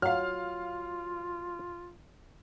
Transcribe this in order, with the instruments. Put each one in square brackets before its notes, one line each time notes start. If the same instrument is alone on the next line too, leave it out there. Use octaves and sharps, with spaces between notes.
[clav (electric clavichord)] F#3 [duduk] F4 [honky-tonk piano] F5 F6